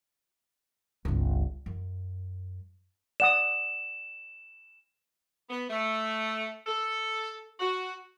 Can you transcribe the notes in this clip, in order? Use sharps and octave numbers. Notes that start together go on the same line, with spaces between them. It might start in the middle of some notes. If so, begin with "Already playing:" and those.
G1 C#2
F#2
D5 F#5 D#6 E7
B3
A3
A4
F#4